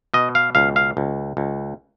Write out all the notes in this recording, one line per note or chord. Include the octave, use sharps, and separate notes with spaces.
B2 D#5
F5
C#2 F5
F5
C#2
C#2